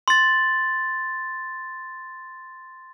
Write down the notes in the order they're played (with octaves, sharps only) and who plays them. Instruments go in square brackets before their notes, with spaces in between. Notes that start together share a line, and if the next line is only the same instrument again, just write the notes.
[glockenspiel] C6 A6